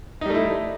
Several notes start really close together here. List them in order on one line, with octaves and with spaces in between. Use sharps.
D#4 G3 A3 E4